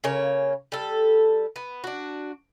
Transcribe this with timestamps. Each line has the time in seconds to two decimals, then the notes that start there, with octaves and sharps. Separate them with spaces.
0.04 C#3 A#3 C#5
0.72 G3 A4
1.56 B3
1.84 D4 F#4